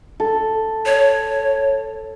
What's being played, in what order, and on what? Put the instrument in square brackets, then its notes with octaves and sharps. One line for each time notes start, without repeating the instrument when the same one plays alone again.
[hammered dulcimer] A4
[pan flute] C#5